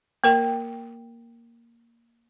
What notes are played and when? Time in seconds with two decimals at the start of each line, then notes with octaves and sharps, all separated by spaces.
0.24 A#3 A#4 G5